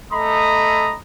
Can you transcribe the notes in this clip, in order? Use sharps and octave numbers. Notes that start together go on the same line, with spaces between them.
A3 A4 D#5 A#5 B5 D#6